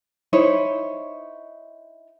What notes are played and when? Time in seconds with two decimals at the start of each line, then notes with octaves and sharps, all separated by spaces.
0.33 D#4 E4 C5 C#5